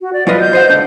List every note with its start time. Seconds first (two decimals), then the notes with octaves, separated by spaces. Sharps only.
0.01 F#4
0.13 D5
0.27 F#3 F4 B4 D#5
0.40 G6
0.53 C5 D#5 F#5
0.70 C#2 D3 D4